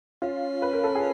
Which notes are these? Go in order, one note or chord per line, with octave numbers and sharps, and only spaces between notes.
C#4 F4
B4
A#4
A4
G#4